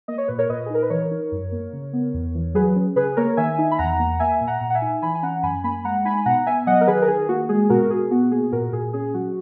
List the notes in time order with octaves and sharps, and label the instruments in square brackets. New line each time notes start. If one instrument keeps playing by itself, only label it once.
[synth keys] A#3 D#5
C#5
A#2 B4
A#4 C#5
A#2 B4 D#5
G#4
D#4 A#4
B4
E3 A#4 C#5
D#4
F#2
A#3
C#3
B3
E2
E3
F#3 G#4 B4
C#4
C#3 G#4 B4
A#3 A#4 C#5
D#3 E5 G#5
D#4
B5
E2 F#5 A#5
A#3
A#3 E5 G#5
A#2
F#5 A#5
A#2
F#5
E5 G#5
D#4
E3 G#5 B5
G#5
C#4 F#5 A#5
F#2 G#5 B5
A#3 G#5 B5
G#3 F#5 A#5
D#4 G#5 B5
B2 F#5 A#5
B3 E5 G#5
F#3 D#5 F#5
A#4
D#3 G#4 B4
A#4
D#3 G#4
A#3 F#4
G#3 G#4
B2 F#4 A#4
B2 G#4
B3 F#4
A#3 G#4
A#2 F#4 A#4
A#2 G#4
C#4 G#4
F#3 F#4